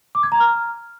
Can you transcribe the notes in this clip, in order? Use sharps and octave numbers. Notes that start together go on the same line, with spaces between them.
D6
G#6
A#5
F6